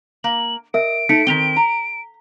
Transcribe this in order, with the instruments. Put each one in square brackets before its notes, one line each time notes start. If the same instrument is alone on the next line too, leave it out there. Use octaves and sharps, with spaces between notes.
[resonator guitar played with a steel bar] A#3 [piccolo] F#7
[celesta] A#4 E5 [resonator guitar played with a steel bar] D#5 [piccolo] D7
[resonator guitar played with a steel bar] A3 [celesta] D#4 B6 C#7
[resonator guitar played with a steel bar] D#3 C4 [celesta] B6 F7 G7
[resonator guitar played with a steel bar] A#5